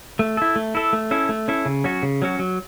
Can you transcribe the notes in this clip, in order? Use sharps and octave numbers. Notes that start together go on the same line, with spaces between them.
A3
E4 A4
A3
E4 A4
A3
C#4 E4 A4
A3
C#4 E4 A4
C#3
F#3 C#4 F#4
C#3
F#3 C#4 F#4
F#3